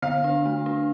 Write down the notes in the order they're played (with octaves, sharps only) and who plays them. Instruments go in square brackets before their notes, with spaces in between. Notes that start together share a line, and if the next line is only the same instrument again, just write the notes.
[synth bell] D3 [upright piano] F5
[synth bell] D4
A3
D4